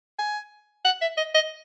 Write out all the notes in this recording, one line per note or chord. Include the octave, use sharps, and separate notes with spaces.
G#5
F#5
E5
D#5
D#5